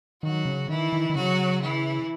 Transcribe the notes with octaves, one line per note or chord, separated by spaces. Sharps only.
D#3 F#3 F#4
C#3
D#3 E3 E4
D#3
D#3
C#3 F#3 F#4
E3 E4